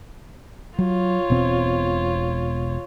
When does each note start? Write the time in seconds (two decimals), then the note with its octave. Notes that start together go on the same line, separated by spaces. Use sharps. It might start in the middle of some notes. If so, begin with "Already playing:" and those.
0.79 F#3 F4 C#5
1.30 E1 B2 C4